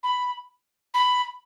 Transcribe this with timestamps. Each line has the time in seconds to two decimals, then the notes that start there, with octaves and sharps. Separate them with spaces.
0.03 B5
0.94 B5